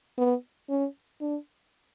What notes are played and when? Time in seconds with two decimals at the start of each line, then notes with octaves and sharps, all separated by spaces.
0.18 B3
0.70 C#4
1.21 D4